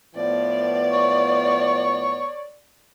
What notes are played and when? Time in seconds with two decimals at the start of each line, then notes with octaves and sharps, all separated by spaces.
0.16 A2 F3 B3 D5
0.91 C#5